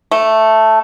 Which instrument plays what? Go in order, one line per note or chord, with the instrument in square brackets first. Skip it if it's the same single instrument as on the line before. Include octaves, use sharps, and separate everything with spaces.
[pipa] A3